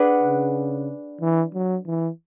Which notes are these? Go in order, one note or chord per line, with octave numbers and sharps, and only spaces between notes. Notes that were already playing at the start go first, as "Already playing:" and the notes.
Already playing: D4 G#4 B4 F#5
C#3
E3
F#3
E3